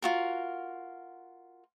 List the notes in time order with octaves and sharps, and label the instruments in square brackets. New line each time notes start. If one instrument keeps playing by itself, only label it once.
[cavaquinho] F4 F#4 A#4